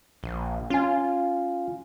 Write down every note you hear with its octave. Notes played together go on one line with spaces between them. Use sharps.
A#1
C#4 F4 G#5